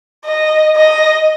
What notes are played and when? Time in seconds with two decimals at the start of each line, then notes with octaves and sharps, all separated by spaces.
0.25 D#5
0.76 D#5